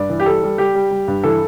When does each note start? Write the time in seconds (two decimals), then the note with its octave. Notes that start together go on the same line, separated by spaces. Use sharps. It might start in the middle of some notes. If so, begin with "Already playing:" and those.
Already playing: G2 D5
0.10 E3
0.20 G4
0.26 G3 A4
0.43 G3
0.58 G3 G4
0.75 G3
0.91 G3
1.08 G2
1.23 E3 A4